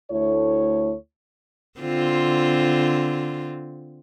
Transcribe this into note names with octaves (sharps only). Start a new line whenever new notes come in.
D2 A3 E4 C#5
D3 C4 F4